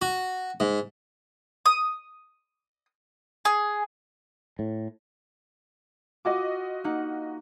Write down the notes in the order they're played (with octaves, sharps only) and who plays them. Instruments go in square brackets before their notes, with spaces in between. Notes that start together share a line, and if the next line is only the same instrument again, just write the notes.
[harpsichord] F#4
G#2
[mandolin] D#6
G#4
[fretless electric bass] A2
[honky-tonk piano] F4 F#4 D#5 [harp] D6
[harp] A#3 D#4 F#5